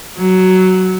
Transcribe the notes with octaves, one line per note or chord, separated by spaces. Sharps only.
F#3